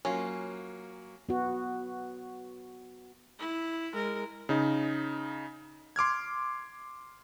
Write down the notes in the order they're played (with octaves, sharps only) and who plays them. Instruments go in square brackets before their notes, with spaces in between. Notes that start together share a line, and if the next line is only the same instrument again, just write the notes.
[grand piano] F#3 A#3 [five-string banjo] C#4 F4
[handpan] B3 F#4
[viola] E4
G#3 A#4
[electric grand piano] C#3 D#4
C6 D6 F6 G#6